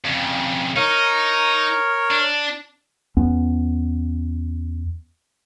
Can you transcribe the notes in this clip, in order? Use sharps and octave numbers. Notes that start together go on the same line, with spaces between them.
F2 C#3
D#4 A#4 C#5
D4
E2 B3 C#4